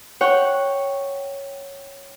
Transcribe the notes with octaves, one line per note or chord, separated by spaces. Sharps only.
C#5 F#5 G5